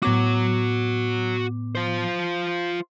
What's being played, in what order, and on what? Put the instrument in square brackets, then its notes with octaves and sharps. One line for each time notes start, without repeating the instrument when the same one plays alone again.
[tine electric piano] A2 B3 D6 [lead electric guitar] F#4 C#5
[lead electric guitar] F4 C5